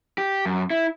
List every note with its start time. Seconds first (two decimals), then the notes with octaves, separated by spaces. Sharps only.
0.18 G4
0.46 F#2
0.70 E4